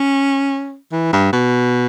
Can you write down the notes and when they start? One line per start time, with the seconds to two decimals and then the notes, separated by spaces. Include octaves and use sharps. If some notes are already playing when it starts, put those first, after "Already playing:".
Already playing: C#4
0.92 E3
1.13 G2
1.33 B2